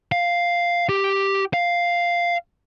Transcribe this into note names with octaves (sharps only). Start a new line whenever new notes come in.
F5
G4
F5